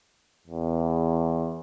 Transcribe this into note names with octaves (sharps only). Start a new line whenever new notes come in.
E2